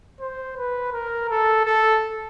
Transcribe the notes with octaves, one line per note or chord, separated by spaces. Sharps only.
C5
B4
A#4
A4
A4